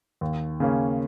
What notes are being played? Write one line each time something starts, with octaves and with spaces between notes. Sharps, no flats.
D#2
C#3 A#3 C#4